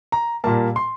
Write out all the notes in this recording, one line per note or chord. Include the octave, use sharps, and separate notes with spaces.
A#5
A#2 G3 A#3 A5
C6